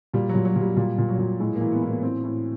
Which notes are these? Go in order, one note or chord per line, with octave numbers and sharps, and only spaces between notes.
A#2 G3
F#3
A#2
F#3
A#2
G3
A#2 G3
A#2
F#3
A#2
A2 G#3
A#3
E3
B3
A2
A#3
A2 C4
A2